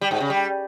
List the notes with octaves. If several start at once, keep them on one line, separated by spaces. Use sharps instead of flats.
G3
G#2
C#3
G3